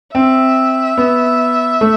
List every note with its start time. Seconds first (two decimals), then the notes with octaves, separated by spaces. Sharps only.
0.14 C4 E5
0.98 B3
1.81 A3